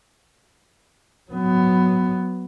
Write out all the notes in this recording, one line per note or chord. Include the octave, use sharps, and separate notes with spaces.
F#3 B3